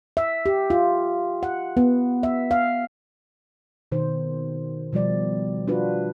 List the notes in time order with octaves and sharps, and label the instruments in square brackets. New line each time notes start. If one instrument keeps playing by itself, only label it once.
[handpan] E5
G4
F4
F#5
B3
E5
F5
B2 D#3 C5
B2 F3 G3 D5
D4 F4 F#4 B4